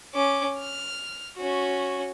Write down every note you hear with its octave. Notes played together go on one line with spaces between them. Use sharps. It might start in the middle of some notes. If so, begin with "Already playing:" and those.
C#4 D6
F6
C#4 F#4